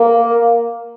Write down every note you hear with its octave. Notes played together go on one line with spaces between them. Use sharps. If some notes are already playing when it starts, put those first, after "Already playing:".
Already playing: A#3